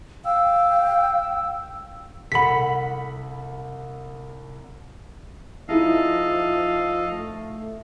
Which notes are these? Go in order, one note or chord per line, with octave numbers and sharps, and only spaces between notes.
F5 G5 E6
C2 A4 F#5 B5 B6
F3 D#4 E4 G#4 A4 D#5 F5
A3